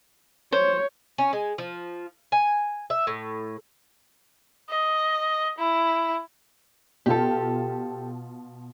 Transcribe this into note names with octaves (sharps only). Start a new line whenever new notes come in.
C5 C#5
C#4
G#3
F3
G#5
E5
A2
D#5
E4
B2 F4 G4 A4 A5